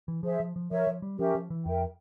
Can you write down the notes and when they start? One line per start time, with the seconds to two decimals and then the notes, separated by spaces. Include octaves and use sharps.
0.08 E3
0.23 F3 G#4 C5 E5
0.40 F3
0.56 F3
0.71 F3 A#4 C#5 E5
0.87 F3
1.02 G3
1.18 F3 C#4 G4 A#4 E5
1.35 F3
1.50 E3
1.66 F2 A#4 E5 G5